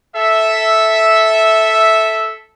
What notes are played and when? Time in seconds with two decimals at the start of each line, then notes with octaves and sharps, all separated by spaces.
0.15 A4 E5